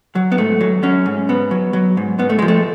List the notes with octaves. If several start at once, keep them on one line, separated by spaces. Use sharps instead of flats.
F#3
B3
G#2 A3
F#3
F#3 C#4
G#2
G#2 B3
F#3
F#3
G#2
G#2 B3
A3
F3 G#3
A3